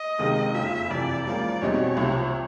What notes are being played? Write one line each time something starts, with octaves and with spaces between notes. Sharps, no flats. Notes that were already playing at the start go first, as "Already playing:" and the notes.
Already playing: D#5
C#2 C3 D#3 G#3 C4
F#1 F2 C#3 F3 E5
F2 C3 E3 D5
C#2 C#3 F3 A#3 D5
E2 B2 G3 C4 D#4 C#5
C2 C3 F3